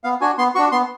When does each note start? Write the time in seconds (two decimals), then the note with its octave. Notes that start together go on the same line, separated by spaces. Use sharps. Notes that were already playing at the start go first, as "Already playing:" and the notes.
0.04 B3 F5
0.21 D4 F#4 G#5
0.38 B3 C6
0.55 D4 F#4 C#6
0.72 B3 C6